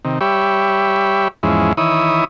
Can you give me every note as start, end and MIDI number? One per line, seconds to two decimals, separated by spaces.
0.05 0.19 48
0.05 0.19 51
0.21 1.28 55
0.21 1.28 67
0.21 1.28 73
0.21 1.28 76
0.21 1.28 83
1.43 1.73 40
1.43 1.73 44
1.43 1.73 53
1.43 1.73 56
1.43 1.73 61
1.43 1.73 64
1.77 2.24 51
1.77 2.24 52
1.77 2.24 64
1.77 2.24 73
1.77 2.24 83
1.77 2.24 87